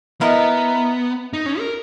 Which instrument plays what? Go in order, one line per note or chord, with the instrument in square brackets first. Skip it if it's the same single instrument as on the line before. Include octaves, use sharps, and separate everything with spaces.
[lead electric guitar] B3 [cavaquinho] E4 A#4 D#5
[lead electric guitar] D#4
C#4
A#4